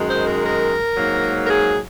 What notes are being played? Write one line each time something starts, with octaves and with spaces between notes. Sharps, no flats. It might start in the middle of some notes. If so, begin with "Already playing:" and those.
Already playing: F#2 D#3 G#3
C5
A#4
A#4
G#2 F#3 A#3
A#4
G#4